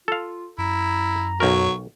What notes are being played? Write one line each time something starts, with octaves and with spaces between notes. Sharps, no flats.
F4 A4 F5
F#2 E4 A#5
B1 F#3 A#4 C#6